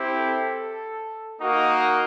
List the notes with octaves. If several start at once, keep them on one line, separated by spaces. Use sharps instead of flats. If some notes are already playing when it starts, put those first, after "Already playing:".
Already playing: C4 E4 G4
A4
A#3 D#4 F#4